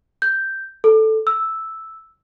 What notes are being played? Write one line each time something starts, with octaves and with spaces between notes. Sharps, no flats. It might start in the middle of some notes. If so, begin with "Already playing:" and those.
G6
A4
E6